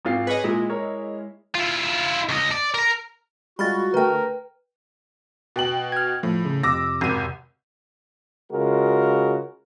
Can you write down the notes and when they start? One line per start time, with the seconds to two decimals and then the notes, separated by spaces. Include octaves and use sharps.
0.05 G#1 F4 C7
0.27 G#4 B4 C#5 D#5
0.44 A#2 G#3 E4
0.69 A#4 C#5
1.55 E4 F4
2.29 C#2 D#5
2.52 D5
2.74 A#4 A#5
3.59 G3 G#3 F4 F#4 B5 F6 A6
3.94 D3 A3 A#4 B4 G5
5.56 B2 G5 F#7
5.92 F6 G#6
6.23 A2 F3
6.45 C#3
6.63 F2 C3 D6 E6 A#6
7.01 G#1 D#7
8.52 C#3 G#3 F4 F#4 A#4